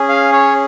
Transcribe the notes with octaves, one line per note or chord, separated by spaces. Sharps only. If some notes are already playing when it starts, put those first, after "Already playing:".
Already playing: C#4 G#4
F5
C#5